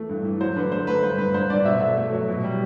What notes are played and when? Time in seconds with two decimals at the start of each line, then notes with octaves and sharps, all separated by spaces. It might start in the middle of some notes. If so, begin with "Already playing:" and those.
Already playing: E3 A3
0.09 G2
0.25 E3
0.41 F#3 C5
0.56 D3 B4
0.72 A3 C5
0.87 A3 B4
1.03 G2 C5
1.18 G2 B4
1.34 G2 C5
1.50 G2 D5
1.65 B2 E5
1.81 A3 E5
1.97 A3
2.12 F#3
2.28 B2
2.44 G3